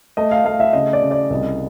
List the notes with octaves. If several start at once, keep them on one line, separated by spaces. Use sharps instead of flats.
A3 D#5
F5
A3 F5
E5
C#3 D#5
D5
C#3
D5
C2 D#5